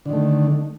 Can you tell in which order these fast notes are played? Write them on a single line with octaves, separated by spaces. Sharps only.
D3 D#3 A3